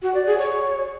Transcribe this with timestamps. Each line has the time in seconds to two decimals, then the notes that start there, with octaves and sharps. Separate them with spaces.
0.02 F#4
0.14 D5
0.26 G#4
0.38 C#5